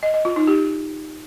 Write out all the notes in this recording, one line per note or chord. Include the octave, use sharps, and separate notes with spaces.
D#5
D#5
F4
D#4
G4